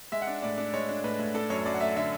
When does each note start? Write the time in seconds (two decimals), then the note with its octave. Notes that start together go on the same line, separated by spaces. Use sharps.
0.12 G#3 E5
0.22 F#5
0.27 D4
0.42 A2 D5
0.58 D4
0.73 G#3 C#5
0.89 D4
1.04 A2 B4
1.19 A2
1.34 D4 A4
1.50 F#2 C#5
1.65 F#2 D5
1.74 F#5
1.80 A3 E5
1.96 D3 E5